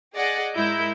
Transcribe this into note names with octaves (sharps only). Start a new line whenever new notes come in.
G#4 D5 D#5 F#5
G#2 G#3 E4 A#4 G6